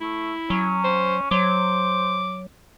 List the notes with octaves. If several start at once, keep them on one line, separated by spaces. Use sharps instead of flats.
A3 E4
F#3 C#4
C5
F#3 C5 D6